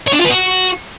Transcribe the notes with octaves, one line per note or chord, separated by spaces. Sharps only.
C#5
D4
F4
B4
F#4